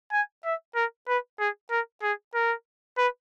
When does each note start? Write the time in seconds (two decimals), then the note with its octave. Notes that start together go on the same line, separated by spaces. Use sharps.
0.12 G#5
0.45 E5
0.75 A#4
1.08 B4
1.39 G#4
1.71 A#4
2.03 G#4
2.35 A#4
2.98 B4